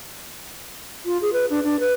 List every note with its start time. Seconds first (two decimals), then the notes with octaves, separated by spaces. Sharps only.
1.05 F4
1.22 G#4
1.33 B4
1.50 D4
1.64 D4
1.80 B4